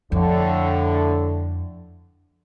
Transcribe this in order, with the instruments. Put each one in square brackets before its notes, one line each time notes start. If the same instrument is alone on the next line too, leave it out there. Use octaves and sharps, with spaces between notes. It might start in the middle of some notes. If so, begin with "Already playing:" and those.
[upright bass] F2 [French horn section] A2 D3